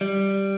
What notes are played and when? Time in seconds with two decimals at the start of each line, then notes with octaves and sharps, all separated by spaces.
0.01 G3